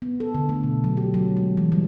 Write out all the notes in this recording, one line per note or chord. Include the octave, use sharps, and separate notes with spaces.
B3
A4
D3
A3
B2
F#3
G4
F#3
G#3
E3
G3